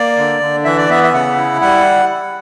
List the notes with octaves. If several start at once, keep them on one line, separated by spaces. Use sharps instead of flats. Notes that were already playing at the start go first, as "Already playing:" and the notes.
Already playing: A#3 D5
D3
D3
E3 E5
D5
B3 E5
E5
C#3 F#5
E4
G3 F#5